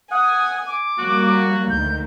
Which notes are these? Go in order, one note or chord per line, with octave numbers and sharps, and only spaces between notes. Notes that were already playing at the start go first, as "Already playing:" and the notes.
F#5 G#5 D#6
D6
F#3 G3 A#3 F#4
D2 D#3 G6